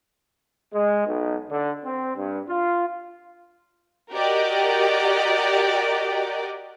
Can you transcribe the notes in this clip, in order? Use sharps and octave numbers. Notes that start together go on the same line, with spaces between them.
G#3
B1
D3
C4
G2
F4
F#4 G4 A#4 D5 D#5